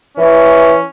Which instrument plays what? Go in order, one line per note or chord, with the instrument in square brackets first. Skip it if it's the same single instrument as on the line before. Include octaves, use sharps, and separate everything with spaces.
[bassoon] E3 [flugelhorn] C#4